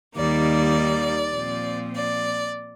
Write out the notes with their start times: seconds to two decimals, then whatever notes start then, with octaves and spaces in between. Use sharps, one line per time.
0.16 D#2 D#3 G3 A#3 D5
1.34 A#2 F3 C4
1.95 D5